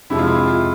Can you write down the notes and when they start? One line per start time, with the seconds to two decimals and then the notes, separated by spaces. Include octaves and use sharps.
0.10 F2 C3 F3 G#3 E4
0.18 F4
0.27 E4
0.47 F4